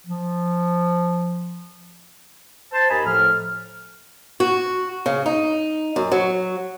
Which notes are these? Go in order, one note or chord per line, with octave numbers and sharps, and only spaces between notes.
F3
C5 A5
D#2 D#5 G#5 A#5 B5
A2 F3 F6
F#4
C#3
D#4
F#2
F#3